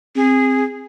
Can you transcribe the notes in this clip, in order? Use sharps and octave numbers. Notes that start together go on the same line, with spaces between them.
C4 G#4